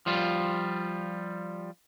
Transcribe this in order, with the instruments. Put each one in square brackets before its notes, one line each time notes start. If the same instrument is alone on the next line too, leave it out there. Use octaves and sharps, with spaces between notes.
[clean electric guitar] F3 G3 F4